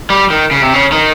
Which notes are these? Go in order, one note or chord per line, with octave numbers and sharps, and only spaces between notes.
G3
D#3
C#3
C3
C#3
D#3